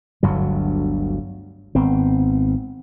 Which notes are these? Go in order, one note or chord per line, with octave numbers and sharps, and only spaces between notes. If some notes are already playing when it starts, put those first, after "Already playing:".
G1 D2 G2 F#3
G#1 B3 C4